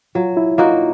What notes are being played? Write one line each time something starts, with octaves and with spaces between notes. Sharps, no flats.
F#3 F4
E4
A#3 D#4 F4 F#4